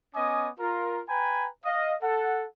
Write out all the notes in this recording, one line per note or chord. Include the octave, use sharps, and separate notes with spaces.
B3 C#4 D#5 G#5 D6 D#6
F4 A#4
B4 G5 G#5 A#5 B5
D#5 F5
A4 F#5